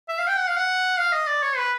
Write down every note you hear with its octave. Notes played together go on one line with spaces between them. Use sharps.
E5
F5
G5
F#5
F5
F#5
F5
D#5
D5
C#5
B4